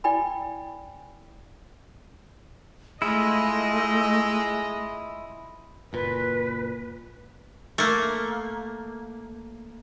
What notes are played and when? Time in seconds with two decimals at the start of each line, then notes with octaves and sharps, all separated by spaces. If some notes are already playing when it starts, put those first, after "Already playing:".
0.04 E4 D5 G5 G#5 B5
3.02 G#3 A3 E4 F4 D#5
5.93 F#1 A#2 B4
7.78 A3 A#3